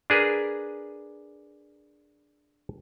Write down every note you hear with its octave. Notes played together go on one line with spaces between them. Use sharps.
D4 G#4 A#4 B4